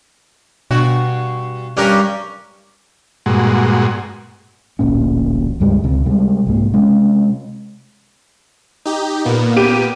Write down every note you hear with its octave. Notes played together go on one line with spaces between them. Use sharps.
G2 B2 F#4
G2 C#4 D4 G4 A#4
G2 A#2 G#3 F#4
D1 A1 A#2 C#4
C#2 G2 G3 G#3
C#2 C3
C3 G3 G#3
C2 G#2 A#3
C3 G#3 C#4
D#4 G4
A#2 A#3 B3
G4 D#7